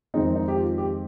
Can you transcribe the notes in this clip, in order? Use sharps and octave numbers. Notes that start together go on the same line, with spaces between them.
F2 D#3 G#3 C4 D#4
D#4
G4
F4
G4